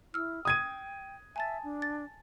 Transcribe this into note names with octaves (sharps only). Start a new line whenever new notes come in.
E4 E6 F6
G5 D#6 G#6 D#7
E5 G#5 A5 A6
D4
A6